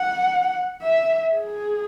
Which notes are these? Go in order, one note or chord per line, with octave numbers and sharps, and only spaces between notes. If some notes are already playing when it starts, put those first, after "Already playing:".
Already playing: F#5
E5
G#4